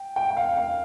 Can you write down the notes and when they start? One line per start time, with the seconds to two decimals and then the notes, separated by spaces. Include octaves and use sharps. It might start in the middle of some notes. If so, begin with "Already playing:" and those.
Already playing: G5
0.16 G5
0.30 G5
0.37 F5
0.57 F5